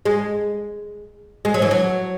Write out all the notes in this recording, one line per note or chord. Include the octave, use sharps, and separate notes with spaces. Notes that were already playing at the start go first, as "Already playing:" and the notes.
G#3
G#3
F#3
E3
F#3